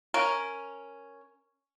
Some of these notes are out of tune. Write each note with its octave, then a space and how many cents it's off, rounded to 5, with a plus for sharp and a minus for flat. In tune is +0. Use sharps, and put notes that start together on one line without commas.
C#4 +0 A#4 +0